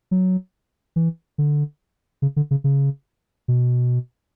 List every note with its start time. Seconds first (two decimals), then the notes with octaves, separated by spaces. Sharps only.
0.11 F#3
0.96 E3
1.38 D3
2.22 C#3
2.36 D3
2.51 C#3
2.64 C#3
3.48 B2